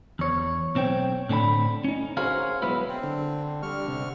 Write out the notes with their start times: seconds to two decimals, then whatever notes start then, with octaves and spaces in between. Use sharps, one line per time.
0.19 E2 C#5
0.75 B1 C4 C#5 G5
1.29 A2 D3 C4 G5 B5
1.84 C#4 D#4
2.17 F#4 G#4 A#4 C5 C#5 F5
2.62 B1 B2 G#3 B3 E4 B4
2.88 C4
3.03 D3
3.63 D3 G3 C#6 F6
3.88 C3